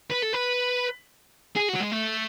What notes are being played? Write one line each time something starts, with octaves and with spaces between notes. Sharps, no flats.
B4
A4
B4
G#4
F#4
F#3
G#3
A3